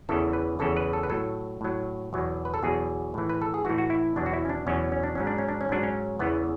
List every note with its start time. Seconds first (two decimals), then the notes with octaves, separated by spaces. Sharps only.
0.09 E2 C#3 E3 A4
0.33 B4
0.59 E2 C#3 E3 A4
0.77 B4
0.93 A4
1.03 B4
1.10 A2 F#3 A4
1.61 A2 F#3
2.13 E2 B2 F#3
2.45 B4
2.54 A4
2.63 E2 B2 F#3 G#4
3.14 A2 E3
3.30 B4
3.42 A4
3.54 G#4
3.65 A2 E3 F#4
3.78 F#4
3.90 E4
4.16 E2 B2 F#3 D4
4.26 F#4
4.33 E4
4.45 C#4
4.49 D4
4.67 E2 B2 F#3 C#4
4.92 C#4
5.03 D4
5.15 G#2 F#3 C#4
5.27 D4
5.38 C#4
5.49 D4
5.61 C#4
5.69 G#2 F#3 D4
5.83 C#4
6.19 E2 C#3 E3 B3